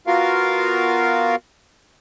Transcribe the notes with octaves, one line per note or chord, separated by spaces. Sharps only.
B3 F4 F#4 A#4 F5